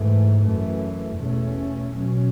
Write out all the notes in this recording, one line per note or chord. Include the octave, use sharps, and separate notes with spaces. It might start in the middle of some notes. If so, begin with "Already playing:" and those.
Already playing: G#2 E3 A3
F#2 E3 A3
E2 B2 A3 C#4
B2 F#3 C#4